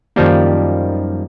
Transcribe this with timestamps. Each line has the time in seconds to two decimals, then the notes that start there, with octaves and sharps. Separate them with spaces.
0.16 F#2 D#3 F3 G3 A#3